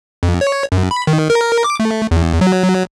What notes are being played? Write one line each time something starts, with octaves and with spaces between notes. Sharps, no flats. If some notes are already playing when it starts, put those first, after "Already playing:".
F2
C#5
F#2
B5
D#3
A#4
D6
A3
E2
F#3